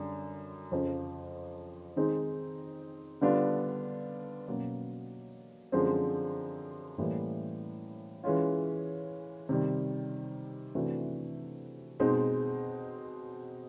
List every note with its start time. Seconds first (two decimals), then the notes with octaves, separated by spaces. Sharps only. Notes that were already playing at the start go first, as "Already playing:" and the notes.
Already playing: F#2 D3 G3
0.71 F2 C#3 F3
1.96 D#3 G#3 C4 D#4 G#4
3.21 D3 G3 B3 D4 F4
4.47 B2 F#3 A#3 C#4
5.72 F#2 D3 F3 G#3 C4
6.98 A2 E3 G3 A#3
8.24 E3 G#3 C#4 F4
9.49 C3 D#3 G3
10.75 C3 E3 A3 D4 F#4
12.00 B2 G#3 C4 D#4